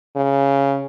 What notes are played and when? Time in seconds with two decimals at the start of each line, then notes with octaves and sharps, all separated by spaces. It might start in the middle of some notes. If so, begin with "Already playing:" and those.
0.16 C#3